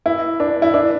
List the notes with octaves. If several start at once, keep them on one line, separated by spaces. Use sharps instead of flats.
E4
D4
E4
D4